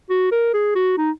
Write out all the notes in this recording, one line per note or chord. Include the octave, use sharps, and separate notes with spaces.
F#4
A#4
G#4
F#4
D#4